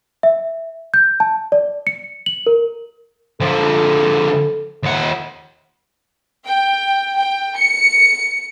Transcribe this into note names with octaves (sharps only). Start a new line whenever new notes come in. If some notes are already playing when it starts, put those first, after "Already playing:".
E5
G6
A5
D5
C#7
F#7
A#4
D3 F3 A4
D#2 F#5
G5
G5
C#7